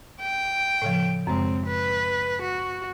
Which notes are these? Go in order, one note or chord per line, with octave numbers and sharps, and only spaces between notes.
G5
A2 C#3 F3
F#2 C#3 G#3 C4
B4
F#4